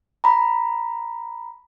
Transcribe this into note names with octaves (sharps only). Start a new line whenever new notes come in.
A#5 B5